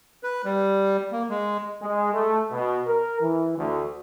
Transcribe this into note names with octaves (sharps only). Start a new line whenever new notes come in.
B4
G3
A#3
G#3
G#3
A3
B2
A#4
E3
D2